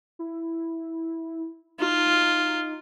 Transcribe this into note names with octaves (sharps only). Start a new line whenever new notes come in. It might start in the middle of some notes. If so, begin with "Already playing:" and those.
E4
D#4 F4